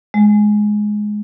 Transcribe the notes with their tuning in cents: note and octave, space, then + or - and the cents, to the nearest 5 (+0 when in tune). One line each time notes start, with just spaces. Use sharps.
G#3 +10